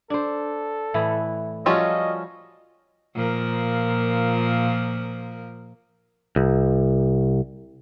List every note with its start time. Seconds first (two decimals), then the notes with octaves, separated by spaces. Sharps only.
0.10 D4 A4 C5
0.94 A2 E3 E4
1.66 F3 G3 C#4 F4 F#4 A4 D#5
3.15 A#2 F3 A#4
6.36 C2